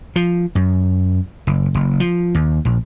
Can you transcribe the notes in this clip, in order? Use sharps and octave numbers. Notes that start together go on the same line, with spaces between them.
F3
F#2
F#1
F#1
F3
D#2
A#1